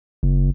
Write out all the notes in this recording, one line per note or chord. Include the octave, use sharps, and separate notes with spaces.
F#1